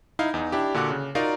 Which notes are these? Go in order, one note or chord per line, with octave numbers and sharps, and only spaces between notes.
D#4 E4 F5
E2 D#4
D4 E4 G4
A#2 D3 F#4 F#5 D6 F#6
C#3
D#4 F4 F#4 A#4 D5 F5